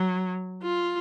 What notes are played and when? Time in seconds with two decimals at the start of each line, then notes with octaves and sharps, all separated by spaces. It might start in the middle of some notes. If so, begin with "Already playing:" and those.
Already playing: F#3
0.63 F4